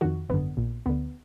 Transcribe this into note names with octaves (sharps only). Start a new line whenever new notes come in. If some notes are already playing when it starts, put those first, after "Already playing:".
F2 D#3 F#4
G#1 F#2 D3 B3
A#1 A#2
D2 D3 B3